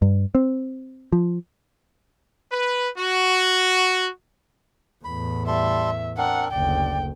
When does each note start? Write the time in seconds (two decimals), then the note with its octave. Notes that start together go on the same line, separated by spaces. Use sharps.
0.02 G2
0.35 C4
1.12 F3
2.50 B4
2.96 F#4
5.05 E2 A2 B5
5.47 G3 A4 E5 C6
6.18 C4 D4 A#4 F#5
6.52 F#1 D2 D5 G5